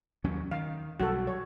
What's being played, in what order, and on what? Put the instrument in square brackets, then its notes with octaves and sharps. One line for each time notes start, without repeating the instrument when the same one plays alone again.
[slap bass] D#2 F#3 C#4
[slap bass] D#3 [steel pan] F5
[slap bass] B1 F#3 G3 [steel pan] F#4 A4
[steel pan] C#5